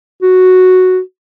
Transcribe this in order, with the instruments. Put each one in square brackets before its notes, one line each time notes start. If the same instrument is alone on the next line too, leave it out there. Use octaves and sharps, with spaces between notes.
[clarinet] F#4